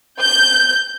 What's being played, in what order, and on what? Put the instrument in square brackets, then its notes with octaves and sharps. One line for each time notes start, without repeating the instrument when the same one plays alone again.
[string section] G6